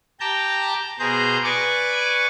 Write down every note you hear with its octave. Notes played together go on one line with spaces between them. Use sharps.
G4 G5 A5 A#5 G6
B2 G#4 C5 A#5 G6
B4 D5 G#5 C#6 D6